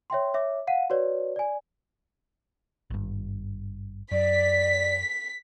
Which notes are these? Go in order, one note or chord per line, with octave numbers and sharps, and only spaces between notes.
C#5 E5 G5 C6
C#5 E5 D6
F5 F#5 D#7
F#4 B4 C#5 D5
D5 G#5
G#1 G2
F#2 D5 B6